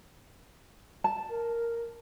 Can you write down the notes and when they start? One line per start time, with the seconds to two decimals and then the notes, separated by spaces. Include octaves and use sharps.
1.04 A5
1.30 A#4